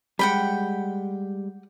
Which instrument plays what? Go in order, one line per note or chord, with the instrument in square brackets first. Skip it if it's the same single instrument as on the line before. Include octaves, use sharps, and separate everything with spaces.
[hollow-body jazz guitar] G3 G#3 [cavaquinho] F#5 G5 B5